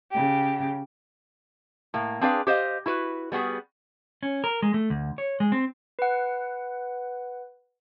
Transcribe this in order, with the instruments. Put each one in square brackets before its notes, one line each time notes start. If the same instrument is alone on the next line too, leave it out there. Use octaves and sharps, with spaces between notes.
[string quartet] C#3 G4
[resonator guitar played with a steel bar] A2 A#3
C4 D4 G#4 B4 D5 F5
G4 C5 D#5 F5
E4 F#4 B4
G3 B3 F#4 G#4
[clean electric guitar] C#4
A#4
G#3
A3
D2
C#5
G#3
C4
[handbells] B4 F#5